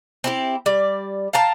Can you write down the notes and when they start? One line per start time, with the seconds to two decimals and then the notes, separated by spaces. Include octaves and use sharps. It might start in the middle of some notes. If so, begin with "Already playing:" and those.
0.24 C4 E4 G4
0.66 G3 D5
1.33 F5 G5 A5 A#5